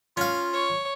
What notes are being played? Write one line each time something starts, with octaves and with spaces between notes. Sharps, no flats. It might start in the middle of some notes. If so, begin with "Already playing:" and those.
C#4 F4 F5
C#5